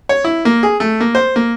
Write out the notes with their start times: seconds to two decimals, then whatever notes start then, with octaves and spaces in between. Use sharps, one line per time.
0.09 C#5
0.24 E4
0.45 A#3
0.63 G#4
0.80 A3
1.00 A#3
1.15 C5
1.36 A#3